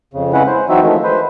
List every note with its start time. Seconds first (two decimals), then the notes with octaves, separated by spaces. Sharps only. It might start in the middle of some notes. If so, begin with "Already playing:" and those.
0.14 F2 C#3
0.33 C#3 G#3 C#4 E4 B4 F#5
0.47 C5
0.69 E3 F#3 C4 D#4 F#4 E5
0.82 D#3 F3 G#3 A3
1.04 B4 C5